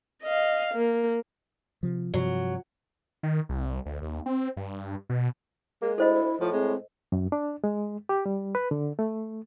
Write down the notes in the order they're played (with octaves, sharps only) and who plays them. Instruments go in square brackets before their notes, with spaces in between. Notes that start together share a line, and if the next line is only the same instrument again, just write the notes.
[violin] D#5 F5
A#3
[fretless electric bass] C3 F3
[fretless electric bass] G2 C3 F3 [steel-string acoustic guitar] F#3
[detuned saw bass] D#3
C2
D2
D#2
C4
G2
B2
[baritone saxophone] G#3 [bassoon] A#3
[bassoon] D2 [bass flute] E4 [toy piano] A4 C5 D#5
[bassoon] A2 [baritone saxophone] F3
[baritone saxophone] G#3 [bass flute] C4
[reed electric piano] F#2
D4
G#3
G4
G3
B4
D3
A3